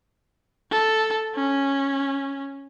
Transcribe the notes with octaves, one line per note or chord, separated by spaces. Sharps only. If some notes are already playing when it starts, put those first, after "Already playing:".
A4
C#4